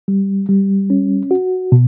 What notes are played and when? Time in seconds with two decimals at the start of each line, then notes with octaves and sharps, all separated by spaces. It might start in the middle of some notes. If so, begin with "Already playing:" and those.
0.08 G3
0.49 G3
0.90 C#4
1.31 F#4
1.72 B2